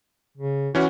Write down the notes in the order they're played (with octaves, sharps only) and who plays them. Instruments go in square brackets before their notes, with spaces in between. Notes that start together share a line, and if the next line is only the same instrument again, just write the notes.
[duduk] C#3
[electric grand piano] E3 C#4 [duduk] F#4